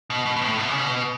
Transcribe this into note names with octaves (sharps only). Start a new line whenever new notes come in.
B2
B2
B2
A2
B2
C#3
B2